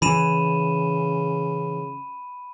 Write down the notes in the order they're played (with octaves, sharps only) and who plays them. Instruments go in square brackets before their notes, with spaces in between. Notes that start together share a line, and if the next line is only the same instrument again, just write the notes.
[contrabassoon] C#3 [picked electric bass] E3 [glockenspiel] B5 D#7 E7